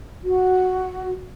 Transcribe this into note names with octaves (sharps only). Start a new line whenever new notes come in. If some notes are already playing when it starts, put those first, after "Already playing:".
F#4